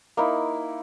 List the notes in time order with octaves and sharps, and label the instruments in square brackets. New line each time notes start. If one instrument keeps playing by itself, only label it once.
[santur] A#3 D#4 E4